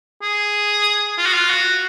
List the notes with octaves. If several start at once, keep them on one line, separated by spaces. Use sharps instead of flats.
G#4
F4
F#4
F4
F#4